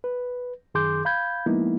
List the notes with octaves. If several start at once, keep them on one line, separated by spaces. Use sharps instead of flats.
B4
F#2 D#3 G#4 C6 D6 G6
F5 B5 G6 G#6
F3 G#3 A#3 B3 D#4 E4